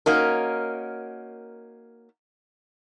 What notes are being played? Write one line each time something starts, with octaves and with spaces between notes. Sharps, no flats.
A#3 C#4 D#4 F#4 A#4